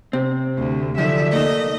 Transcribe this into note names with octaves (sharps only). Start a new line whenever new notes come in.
C3 C4
D2
F#2 D3 D#3 F3 A4 E5
A3 A#3 D#4 D#5 D#6